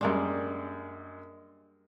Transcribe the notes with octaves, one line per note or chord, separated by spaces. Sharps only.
F#2 G3 G#3 A#3 D4 C6